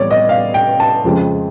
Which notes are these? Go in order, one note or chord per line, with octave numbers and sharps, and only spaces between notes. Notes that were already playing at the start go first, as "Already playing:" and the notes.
Already playing: A2 E3 G3 B3 C#5 D5
D#5
F5
G5
A5
F2 C#3 F3 G#3 C4